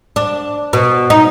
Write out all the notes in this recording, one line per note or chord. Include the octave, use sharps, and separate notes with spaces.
D4
B2
D#4